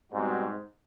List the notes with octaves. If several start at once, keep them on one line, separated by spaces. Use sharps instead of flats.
G#2 B2 G3 C4 D#4 F#4